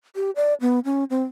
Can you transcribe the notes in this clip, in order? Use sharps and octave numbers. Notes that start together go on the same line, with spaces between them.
G4
D5
B3
C#4
C4